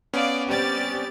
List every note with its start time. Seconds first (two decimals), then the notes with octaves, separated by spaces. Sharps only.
0.14 B3 C#4 D5 F5
0.47 G3 C4 G4 D5 A6